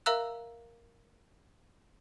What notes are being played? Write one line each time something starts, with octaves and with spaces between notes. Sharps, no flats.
A#4 E5 F5 A#5 E6 F#6